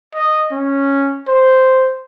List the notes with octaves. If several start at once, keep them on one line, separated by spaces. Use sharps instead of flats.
D#5
C#4
C5